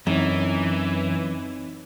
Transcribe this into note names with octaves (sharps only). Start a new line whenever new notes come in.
F#2 E3 C4 D#4 C#5